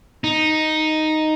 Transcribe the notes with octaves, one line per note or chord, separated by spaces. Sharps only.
D#4